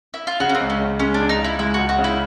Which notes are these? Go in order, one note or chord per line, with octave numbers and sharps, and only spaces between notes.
E4
F4
C#3 F#4
C#4
C4
C#2
C#4
C#2
G#3 C#4
D4
C#2
D#4
C#3
E4
G#3 E4
C#2 F#4
F#4
C#3
E4